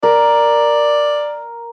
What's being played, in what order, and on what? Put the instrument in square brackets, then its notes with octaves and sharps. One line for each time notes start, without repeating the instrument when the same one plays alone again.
[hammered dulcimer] A#4 [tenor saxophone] D5